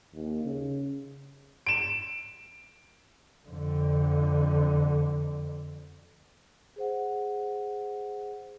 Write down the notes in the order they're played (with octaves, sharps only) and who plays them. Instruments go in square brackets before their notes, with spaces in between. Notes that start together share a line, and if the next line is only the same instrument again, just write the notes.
[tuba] D#2
C#3
[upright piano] D7 E7
[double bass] F2 D3
[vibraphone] G#4 C5 F#5